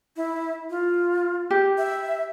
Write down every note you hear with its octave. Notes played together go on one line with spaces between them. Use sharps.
E4
F4
G4
E5